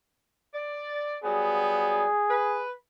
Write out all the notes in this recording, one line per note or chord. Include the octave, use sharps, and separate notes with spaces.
D5
F#3 G3 B3 G#4
B4